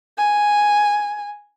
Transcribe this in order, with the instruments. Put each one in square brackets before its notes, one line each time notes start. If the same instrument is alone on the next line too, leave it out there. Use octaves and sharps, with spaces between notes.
[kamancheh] G#5